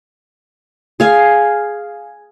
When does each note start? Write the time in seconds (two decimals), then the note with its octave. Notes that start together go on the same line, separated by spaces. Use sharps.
1.00 G#4 F5 G#5